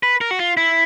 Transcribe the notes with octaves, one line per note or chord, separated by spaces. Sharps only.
B4
A#4
F#4
F4
E4